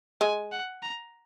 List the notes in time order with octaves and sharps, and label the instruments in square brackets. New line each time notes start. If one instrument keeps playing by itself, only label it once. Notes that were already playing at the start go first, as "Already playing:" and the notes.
[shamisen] G#3 [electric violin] G#5
[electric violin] F#5
A#5